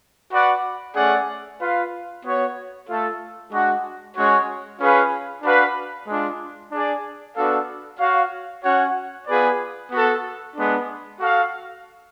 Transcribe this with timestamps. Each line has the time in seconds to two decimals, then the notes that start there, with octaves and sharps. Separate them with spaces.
0.31 F#4 B4 D5 F#5
0.95 A3 C#4 G#4 D5 F#5
1.59 F4 B4 F5
2.24 B3 F#4 C#5
2.88 A3 F4 A4
3.51 G#3 D4 F#4
4.16 G#3 C#4 F#4 C#5
4.79 C#4 F4 G#4 B4 F5
5.43 D4 F#4 B4 F5
6.07 G#3 D4 F4
6.72 D4 G#4 D5
7.36 B3 D4 F#4 A4 F5
7.99 F#4 C#5 F5
8.64 C#4 F#4 C#5 F#5
9.27 B3 F4 G#4 B4 D5
9.91 B3 F#4 A4
10.55 G#3 B3 D4
11.20 F#4 A4 F5